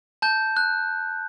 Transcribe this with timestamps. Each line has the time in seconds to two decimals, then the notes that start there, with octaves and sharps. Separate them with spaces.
0.22 A5 G6
0.57 F#6